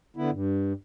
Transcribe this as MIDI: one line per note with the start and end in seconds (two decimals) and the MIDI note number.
0.17 0.31 50
0.17 0.31 59
0.17 0.31 64
0.31 0.73 43